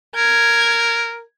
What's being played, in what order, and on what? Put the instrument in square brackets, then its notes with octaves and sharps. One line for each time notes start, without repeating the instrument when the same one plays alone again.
[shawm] A#4 [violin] G#6